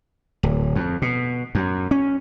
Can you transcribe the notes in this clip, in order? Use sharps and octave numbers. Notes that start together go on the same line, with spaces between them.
D1
F2
B2
F#2
C#4